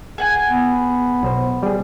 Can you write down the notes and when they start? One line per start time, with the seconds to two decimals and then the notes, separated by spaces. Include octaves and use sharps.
0.18 G#4 F#5 G#5
0.49 B3
1.23 B1 C5
1.63 G3 G#4